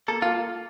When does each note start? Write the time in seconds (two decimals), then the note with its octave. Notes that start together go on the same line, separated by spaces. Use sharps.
0.08 A#3 A4
0.22 A#3 F4